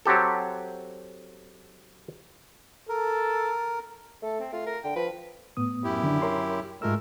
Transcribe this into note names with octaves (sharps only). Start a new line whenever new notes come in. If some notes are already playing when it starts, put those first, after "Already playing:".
F#3 C4 G4 A4
A4 A#4
A3 A4
C4
A3 F4
A#4
D3 G5
F3 B4
A2 B3 D#6
F#2 E4 G4
D3 D4
A#4 C#5 C6
G#2 G#3 A3 F4 A#4 E6